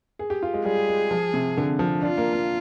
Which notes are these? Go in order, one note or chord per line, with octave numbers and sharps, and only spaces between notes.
G#4
G4
F4
G#3
G3 G#4
G#3
F3
C3
D3
F3
D4 F4
A#3
A#3